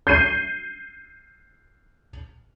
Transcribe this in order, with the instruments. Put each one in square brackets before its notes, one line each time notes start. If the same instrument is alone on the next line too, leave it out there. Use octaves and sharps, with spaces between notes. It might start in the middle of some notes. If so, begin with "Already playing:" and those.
[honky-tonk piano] G6 C7 D#7